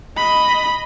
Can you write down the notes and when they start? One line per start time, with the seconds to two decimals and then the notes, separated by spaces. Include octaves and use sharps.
0.17 D#5 B5